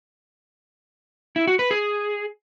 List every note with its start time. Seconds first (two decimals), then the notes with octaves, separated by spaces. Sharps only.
1.36 E4
1.47 F#4
1.59 B4
1.71 G#4